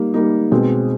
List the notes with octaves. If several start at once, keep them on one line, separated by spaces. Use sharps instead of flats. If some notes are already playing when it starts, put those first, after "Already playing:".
Already playing: G3 A#3 D#4
G3 A#3 D#4
B2 G#3 C4